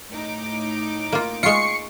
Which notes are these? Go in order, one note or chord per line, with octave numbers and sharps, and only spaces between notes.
A2 D#4 D6
A#3 F4
G#3 F4 C#6 C7 C#7